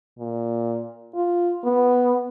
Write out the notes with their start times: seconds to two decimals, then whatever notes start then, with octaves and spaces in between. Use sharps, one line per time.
0.19 A#2
1.14 F4
1.64 B3